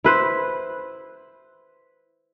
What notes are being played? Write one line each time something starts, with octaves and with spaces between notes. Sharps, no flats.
E4 B4 C5